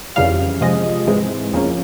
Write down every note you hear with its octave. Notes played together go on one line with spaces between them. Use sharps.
F2 C#3 E3 G3 F5
C3 F3 G#3 D#5
G#2 E3 G#3 C4
E2 C#3 F3 A#3 C#4